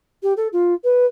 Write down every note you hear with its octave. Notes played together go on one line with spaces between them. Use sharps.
G4
A4
F4
B4